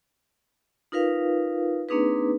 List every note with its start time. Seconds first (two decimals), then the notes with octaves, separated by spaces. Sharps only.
0.92 D#4 F4 A#4 B4 F5
1.89 A#3 C4 D4 D#4 G#4 B4